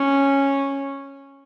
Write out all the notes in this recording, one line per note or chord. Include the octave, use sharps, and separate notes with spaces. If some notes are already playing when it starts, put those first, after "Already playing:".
Already playing: C#4